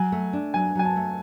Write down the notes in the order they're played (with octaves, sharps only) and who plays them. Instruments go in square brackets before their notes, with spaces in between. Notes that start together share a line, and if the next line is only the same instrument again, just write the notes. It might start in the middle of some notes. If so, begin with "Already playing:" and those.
Already playing: [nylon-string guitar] F#3 [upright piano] G#5
[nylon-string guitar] A3
D4
[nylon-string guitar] F#3 [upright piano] G#5
[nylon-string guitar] F#3 [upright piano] G#5
[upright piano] A5
[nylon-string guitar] A3